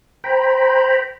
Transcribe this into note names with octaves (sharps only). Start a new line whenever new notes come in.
C5 G5 A#5 B5